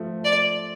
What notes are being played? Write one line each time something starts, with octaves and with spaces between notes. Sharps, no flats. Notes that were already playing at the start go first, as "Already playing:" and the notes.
Already playing: F3 A3
D5